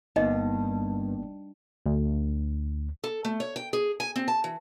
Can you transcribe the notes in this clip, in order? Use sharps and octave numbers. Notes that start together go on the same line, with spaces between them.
G1 G2 A#3 B3 D#4 D#5
D2
A4
A3
C#5
G5
G#4
G#5
C4
A5
E3